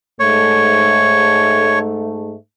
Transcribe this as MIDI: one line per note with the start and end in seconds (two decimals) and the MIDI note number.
0.20 2.34 44
0.20 2.34 57
0.20 1.79 73